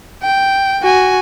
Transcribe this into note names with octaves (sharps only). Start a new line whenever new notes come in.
G5
F#4 G#5